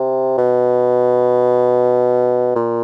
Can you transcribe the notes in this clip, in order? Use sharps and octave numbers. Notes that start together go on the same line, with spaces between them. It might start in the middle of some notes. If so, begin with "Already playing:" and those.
Already playing: C3
B2
A#2